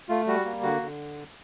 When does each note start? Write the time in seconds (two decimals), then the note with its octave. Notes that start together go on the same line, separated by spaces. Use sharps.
0.09 A3 F4
0.27 G3 F#4
0.45 A#3
0.63 D3 F#4
0.82 D3